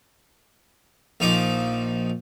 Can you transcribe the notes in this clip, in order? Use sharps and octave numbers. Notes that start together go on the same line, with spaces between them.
A#1 F3 D#4 D6